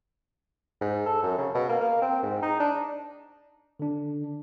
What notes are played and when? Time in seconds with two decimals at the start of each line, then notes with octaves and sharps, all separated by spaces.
0.81 G#2
1.06 A4
1.23 F#2
1.38 C#3
1.54 B2
1.69 A#3
1.80 A#3
2.02 C4
2.23 G#2
2.42 D#4
2.60 D4
3.79 D3 D4